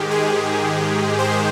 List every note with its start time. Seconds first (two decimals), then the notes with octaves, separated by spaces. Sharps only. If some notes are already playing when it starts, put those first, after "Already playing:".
Already playing: G#2 D#3 G#3 G4
0.11 G#4
1.19 C5